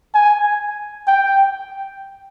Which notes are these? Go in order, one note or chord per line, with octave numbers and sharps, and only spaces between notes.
G#5
G5